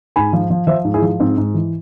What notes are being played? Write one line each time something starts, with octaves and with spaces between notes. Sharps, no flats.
G#2 G#5 B5
F3
F3
F3 C5 E5
G#2
E4 G#4
F3
G#2 C4
G#2
E3